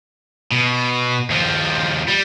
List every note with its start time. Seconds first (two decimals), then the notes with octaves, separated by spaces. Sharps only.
0.52 B2
1.30 D#2 F3
2.08 G3